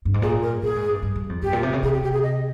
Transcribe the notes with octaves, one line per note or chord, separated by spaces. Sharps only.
G2
G#2
A#2 G#4
A#4
A#2 G#4
G#2
G2
G2
G2
F2
G2 G4
A#2
C3
C#3
C3 G#4
G4
G4
G#4
D#5